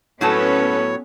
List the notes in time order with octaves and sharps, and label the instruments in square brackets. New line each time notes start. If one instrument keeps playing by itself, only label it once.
[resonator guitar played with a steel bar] A2 F#3 A5 [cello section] B3 C#4 B4 [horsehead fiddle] A4 [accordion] C#5